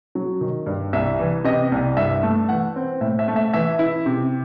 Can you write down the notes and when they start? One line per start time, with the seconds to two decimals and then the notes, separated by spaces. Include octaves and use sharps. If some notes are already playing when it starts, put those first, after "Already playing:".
0.15 F#3
0.41 D#3
0.66 G2
0.93 C2 E5
1.20 E3
1.44 C3 D#5
1.72 C2
1.97 G2 E5
2.23 A3
2.49 E3 F#5
2.76 C4
3.01 A2 E5
3.19 E5
3.28 A3
3.36 E5
3.53 E3 E5
3.79 E4
4.06 C3